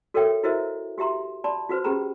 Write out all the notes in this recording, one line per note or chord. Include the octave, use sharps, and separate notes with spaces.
F#4 A4 A#4 C#5 E5 G5
E4 F#4 A#4 C5 D#5 E5
F#4 G4 E5 A#5 C6
D5 A5 B5 C6
F4 F#4 B4 C5
C#4 G4 G#4 B4 A#5 B5